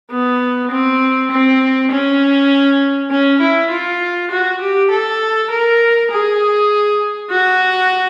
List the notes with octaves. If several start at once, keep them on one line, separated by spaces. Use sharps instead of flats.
B3
C4
C4
C#4
C#4
E4
F4
F#4
G4
A4
A#4
G#4
F#4